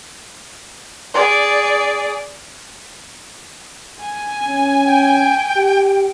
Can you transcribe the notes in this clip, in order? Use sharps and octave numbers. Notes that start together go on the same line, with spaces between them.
G#4 D5
G#5
C#4
G5
G4